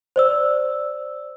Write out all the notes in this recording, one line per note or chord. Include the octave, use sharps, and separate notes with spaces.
C5 D5 E6